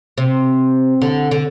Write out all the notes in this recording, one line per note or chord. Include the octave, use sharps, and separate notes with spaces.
C3
D3
D3